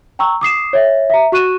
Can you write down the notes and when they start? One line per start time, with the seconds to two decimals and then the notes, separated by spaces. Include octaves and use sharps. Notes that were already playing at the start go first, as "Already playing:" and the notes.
0.19 G5 A#5 C#6 E6
0.41 D6 D#6 C7 E7
0.73 C#5 E5
1.10 E5 A#5
1.32 F#4 C#6 F#6 D#7 E7